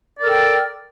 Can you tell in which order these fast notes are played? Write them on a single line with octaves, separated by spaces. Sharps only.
D5 A#4 A4 G5